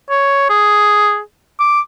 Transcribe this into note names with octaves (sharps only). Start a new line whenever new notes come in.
C#5
G#4
D6